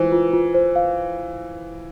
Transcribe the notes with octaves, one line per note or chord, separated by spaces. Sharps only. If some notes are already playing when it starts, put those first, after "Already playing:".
Already playing: E3 F4 C5
F4
F4
C5
F5